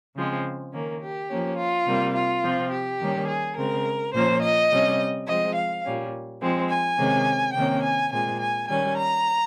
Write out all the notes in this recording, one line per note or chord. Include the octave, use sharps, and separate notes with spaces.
C#3 F3 G#3 C4
D#3 A#3 C#4
G4
F3 A#3 C#4
F4
C3 G3 A#3
F4
C3 F3 C4
G4
D#3 G3 A#3 C#4
G#4
C#3 G#3 C4 A#4
A#2 F3 A#3 C#4 C5
D#5
C3 G3 C#4
F3 G#3 C4 D#5
F5
A#2 G3 C#4
F3 G#3 C4
G#5
C3 D#3 G#3 C#4
C3 D#3 A#3 C#4 G5
G#5
A#2 G#3 C4 G#5
G#5
D#3 G3 C#4 G#5
A#5